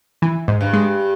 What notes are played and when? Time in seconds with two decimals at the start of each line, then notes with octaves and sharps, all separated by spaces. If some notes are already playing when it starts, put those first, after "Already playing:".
0.22 E3
0.48 G#2
0.61 G2
0.73 G#3